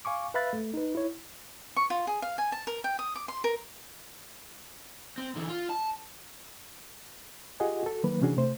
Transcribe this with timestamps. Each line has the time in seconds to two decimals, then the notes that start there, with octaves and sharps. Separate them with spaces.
0.05 F5 G#5 C#6 D6
0.34 B4 E5 F5 B5 F#6 A6
0.53 A3
0.74 D#4 B4
0.95 E4 C#5
1.76 C#6
1.90 F4
2.07 G#4
2.22 F5
2.38 G#5
2.52 A5
2.67 A#4
2.84 G5
2.99 D#6
3.16 D6
3.28 C6
3.44 A#4
5.18 C4
5.36 D3 E3
5.49 F4
5.70 A5
7.60 F4 G4 G#4 D#5 F#5 G#5
7.83 F#4 A4
8.04 D#3 F#3 A#3 B4
8.21 C3 E3 C#4 D4 F#4 G#4
8.37 C3 A3 C5